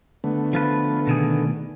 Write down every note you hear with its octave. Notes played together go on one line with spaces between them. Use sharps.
D3 A3 B3
F3 F4 B4
B2 D#3 G#4